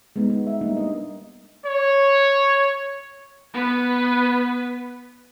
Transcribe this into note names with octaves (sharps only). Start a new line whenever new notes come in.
G#3 B3 D#4
G#3
E5
G3 A#3 D4 D#4
D#5
C#5
B3 B4